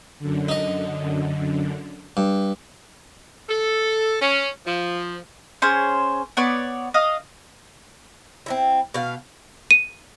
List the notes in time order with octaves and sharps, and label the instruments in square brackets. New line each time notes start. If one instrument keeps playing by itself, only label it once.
[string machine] F#2 D3
[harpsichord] D#4 D#5
G2
[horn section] A4
C#4
F3
[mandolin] C#4 G#4 C5 C#5
B3 C#5 D5 C#6
D#5 F5 D#6
[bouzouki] C4 D#4 E4
B2 F5
[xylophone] D#7